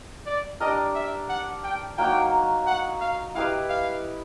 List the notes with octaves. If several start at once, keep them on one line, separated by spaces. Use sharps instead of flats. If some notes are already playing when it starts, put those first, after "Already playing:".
D5
D4 G4 A#4 D5 D#5
E5
F#5
G5
F#3 A#3 D#4 F#4 G5
F#5
F5
E4 G4 B4 D#5 F5
F5